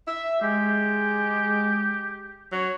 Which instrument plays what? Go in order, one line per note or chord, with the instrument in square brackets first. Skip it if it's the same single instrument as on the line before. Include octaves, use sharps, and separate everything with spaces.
[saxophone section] E5
[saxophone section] G#3 [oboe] G4
[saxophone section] F#3 C#5